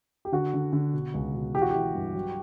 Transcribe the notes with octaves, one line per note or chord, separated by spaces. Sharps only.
G4
D3 F#4
D3
D3
B2
C#2
B2
E3 G4
F#4
E3 G4
G2
F#3